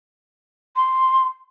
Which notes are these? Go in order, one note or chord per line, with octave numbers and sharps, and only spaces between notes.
C6